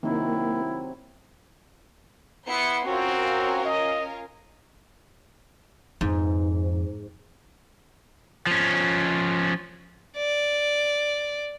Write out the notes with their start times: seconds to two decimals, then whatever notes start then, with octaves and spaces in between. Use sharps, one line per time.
0.03 C3 D#3 F#3 A#3 E4
2.47 B3 E4 C6 C#7
2.87 C4 C#4 F4 F#4 A#4
3.65 D#5
6.01 F2 G#2
8.47 F3 C#4
10.17 D5